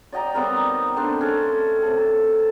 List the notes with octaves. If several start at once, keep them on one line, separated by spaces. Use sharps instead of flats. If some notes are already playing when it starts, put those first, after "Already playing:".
D5 D#5 G5 A#5
G3 B3 C4 A#4
D#4
A3 C4 D4 C5
C#4 A4
C3 A4